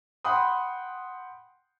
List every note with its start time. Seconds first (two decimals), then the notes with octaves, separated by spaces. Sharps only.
0.25 F#5 G5 B5 C6 D#6